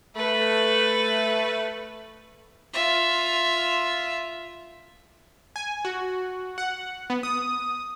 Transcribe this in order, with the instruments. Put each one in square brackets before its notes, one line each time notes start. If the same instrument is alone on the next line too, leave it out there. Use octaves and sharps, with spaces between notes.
[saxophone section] A3 [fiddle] B4
[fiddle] F4 E5
[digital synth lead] G#5
F#4
F#5
B3
D#6